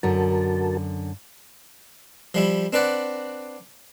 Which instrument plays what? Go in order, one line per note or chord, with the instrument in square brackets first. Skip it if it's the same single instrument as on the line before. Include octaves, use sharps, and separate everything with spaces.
[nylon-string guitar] F#2 D3 [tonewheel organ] F#4 A#4 A5
[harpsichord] F3 G3 E4
C4 D4 B4 D5 F#5